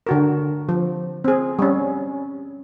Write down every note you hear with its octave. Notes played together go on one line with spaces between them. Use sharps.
D3 F#4 A#4
F3
C4 G#4
G3 C#4